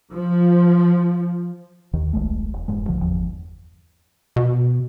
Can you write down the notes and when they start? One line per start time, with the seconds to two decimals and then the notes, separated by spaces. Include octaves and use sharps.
0.13 F3
1.93 D#2 D#3
2.13 D#1 B1 G#3 A3
2.53 E1
2.68 E1 G2 G#3
2.88 C2 D3 F3
3.01 G1 E2 F3
4.36 B2